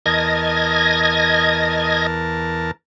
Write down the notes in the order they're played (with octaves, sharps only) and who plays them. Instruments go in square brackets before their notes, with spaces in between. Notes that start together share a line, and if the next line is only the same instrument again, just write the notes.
[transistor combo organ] E2 A#4 A5 [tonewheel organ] D#5 G#6 A#6